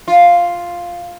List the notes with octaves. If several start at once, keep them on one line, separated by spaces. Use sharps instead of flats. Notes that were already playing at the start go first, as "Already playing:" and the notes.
F4